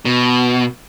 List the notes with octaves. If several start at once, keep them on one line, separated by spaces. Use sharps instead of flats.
B2